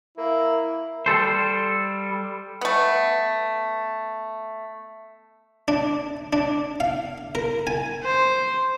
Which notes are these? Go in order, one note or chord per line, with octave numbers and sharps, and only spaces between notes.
A#3 E4
G3 A4 C5
A3 B3
D4
D4
F5
A#4
G#5
C5